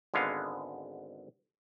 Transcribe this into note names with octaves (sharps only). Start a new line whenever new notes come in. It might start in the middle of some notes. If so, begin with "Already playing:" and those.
G#1 D3 G#3 B3 F5